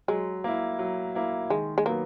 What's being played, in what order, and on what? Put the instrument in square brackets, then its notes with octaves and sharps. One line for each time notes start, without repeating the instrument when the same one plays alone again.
[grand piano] F#3 [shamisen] G#3
[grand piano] A#3 E4
F#3
A#3 E4
[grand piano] D#3 [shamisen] G#3
[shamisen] G#3
[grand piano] F#3 B3 [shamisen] A#3